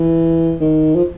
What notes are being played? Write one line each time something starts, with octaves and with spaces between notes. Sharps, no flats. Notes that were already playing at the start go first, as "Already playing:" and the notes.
Already playing: E3
D#3
F3